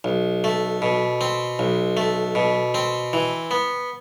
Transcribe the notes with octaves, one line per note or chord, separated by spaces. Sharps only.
B1
A3
B2
C4
B1
A3
B2
C4
E3
B3